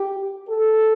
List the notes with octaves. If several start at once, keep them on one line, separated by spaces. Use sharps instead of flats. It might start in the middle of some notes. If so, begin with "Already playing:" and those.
Already playing: G4
A4